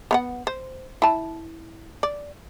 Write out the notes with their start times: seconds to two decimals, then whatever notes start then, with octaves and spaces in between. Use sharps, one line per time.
0.11 B3 F5 F#5
0.47 C5
1.02 E4 A5
2.03 D5